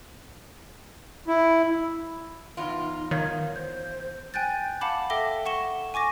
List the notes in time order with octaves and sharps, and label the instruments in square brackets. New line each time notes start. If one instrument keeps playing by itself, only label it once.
[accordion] E4
[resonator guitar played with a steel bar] E2 F4 [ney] D#4
[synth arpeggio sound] D#3 [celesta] C#5 F5 G#6
[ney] C5 [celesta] G6
[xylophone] G5 G#5 F#6 G6 A6
F5 F#5 A5 B5 D6
A4 E5 G5 D6 A#6 G7
F#5 C#6 E7 G7
G#5 C#6 D6 A#6